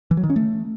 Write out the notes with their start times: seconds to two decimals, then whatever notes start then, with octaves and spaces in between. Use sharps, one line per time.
0.11 E3
0.17 F#3
0.23 D#3
0.30 C#4
0.36 A3